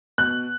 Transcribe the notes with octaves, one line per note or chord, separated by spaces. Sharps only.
B2 F#6